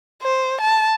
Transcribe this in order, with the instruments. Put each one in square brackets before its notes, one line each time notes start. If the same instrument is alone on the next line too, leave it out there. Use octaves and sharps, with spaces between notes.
[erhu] C5
A5